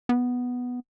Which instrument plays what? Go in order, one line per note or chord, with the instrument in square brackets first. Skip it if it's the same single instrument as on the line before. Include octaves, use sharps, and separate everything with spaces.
[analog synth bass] B3